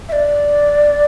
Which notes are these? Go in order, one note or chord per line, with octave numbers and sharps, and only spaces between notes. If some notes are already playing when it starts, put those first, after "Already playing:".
E5
D5